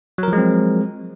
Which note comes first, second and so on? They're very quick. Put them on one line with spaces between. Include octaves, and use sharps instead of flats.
F#3 A#4 F3 G#3 C4